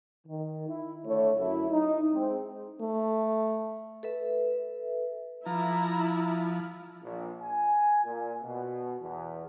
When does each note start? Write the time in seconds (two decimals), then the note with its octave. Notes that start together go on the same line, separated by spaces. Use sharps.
0.27 D#3
0.69 E4
1.05 D3 A3 E4 C#5
1.39 F#2 E4
1.70 D#4
2.12 G#3 C4
2.81 A3
4.03 A4 B4 E5
5.46 F3 E4 A#5
7.03 A#1
7.43 G#5
8.04 A#2
8.43 B2
9.01 E2